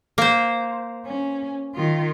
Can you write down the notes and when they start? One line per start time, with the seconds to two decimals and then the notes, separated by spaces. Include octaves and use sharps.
0.18 A#3 C5
1.06 C#4
1.75 D#3 F4